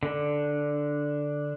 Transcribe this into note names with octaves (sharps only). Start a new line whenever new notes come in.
D3 D4